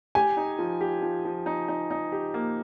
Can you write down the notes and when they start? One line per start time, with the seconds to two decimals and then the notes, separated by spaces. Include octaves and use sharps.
0.15 G4 G#5
0.37 D#4
0.59 F3
0.81 G4
1.02 F3
1.25 F3
1.46 D#4
1.68 D#4
1.91 D#4
2.12 G4
2.34 A#3